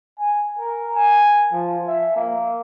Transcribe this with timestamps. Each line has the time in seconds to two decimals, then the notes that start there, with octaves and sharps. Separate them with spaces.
0.19 G#5
0.58 A#4
0.95 G#5
1.52 F3
1.87 E5
2.16 A#3